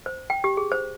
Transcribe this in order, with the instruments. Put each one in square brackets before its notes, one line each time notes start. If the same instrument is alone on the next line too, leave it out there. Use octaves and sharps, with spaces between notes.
[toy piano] C5
G5
G4
G#4
C5